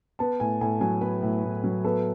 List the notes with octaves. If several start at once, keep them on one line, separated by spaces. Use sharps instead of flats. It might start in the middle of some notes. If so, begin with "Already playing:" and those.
B3 A5
A2 G#5
A2 G#5
F#3 G#5
B3 B4
A2
A2
F#3
B3 A4